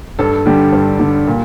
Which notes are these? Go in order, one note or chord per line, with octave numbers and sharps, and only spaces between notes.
G2 A4
D3 G3 G4
G2
D3 G3
A#2